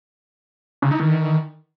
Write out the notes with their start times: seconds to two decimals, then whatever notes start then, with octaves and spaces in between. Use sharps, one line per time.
0.82 C#3
0.91 D#4
1.00 D#3